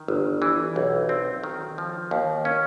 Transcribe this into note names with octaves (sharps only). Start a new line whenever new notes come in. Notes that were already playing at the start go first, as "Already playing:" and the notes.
Already playing: D#3
G1
E3
B1
C4
D#3
F3
D#2
C#4